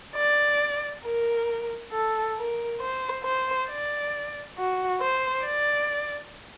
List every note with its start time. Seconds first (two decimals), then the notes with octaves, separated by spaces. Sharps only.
0.16 D5
1.04 A#4
1.92 A4
2.37 A#4
2.81 C5
3.24 C5
3.69 D5
4.58 F#4
5.01 C5
5.46 D5